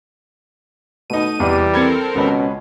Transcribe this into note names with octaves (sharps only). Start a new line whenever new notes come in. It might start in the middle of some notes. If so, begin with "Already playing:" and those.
B2 A3 D#4 D#7
E2 C3 E3 G3
C4 A4 A#4 B5 G#6 C#7
C#2 B2 C#4 B4